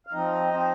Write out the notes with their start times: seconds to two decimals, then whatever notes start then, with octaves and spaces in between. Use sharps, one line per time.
0.07 F5
0.13 F3 C4 D#4 D#5
0.53 C4 C5